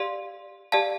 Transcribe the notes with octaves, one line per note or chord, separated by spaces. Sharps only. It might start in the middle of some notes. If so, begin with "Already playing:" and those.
Already playing: G4 D5 F5 C6
G4 D5 F5 A5